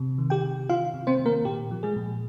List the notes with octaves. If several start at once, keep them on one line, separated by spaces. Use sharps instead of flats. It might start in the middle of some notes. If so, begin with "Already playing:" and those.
Already playing: C3
D#3
G4 G5
C3
D#3 F4 F5
C3
C4 C5
D#3
A#3 A#4
A#2 G4
F3
G#3 G#4
A#2